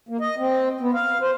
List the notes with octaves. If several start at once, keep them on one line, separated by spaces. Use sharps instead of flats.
A#3
D#5
C4
B3
F5
C5